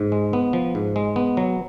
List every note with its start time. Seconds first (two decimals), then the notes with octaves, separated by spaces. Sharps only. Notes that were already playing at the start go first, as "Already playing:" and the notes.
Already playing: G#2
0.12 G#3
0.33 B3
0.53 F3
0.75 G#2
0.96 G#3
1.16 B3
1.37 F#3